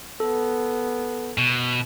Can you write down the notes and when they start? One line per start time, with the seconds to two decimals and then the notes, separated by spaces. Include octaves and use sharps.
0.20 B3 A4
1.38 B2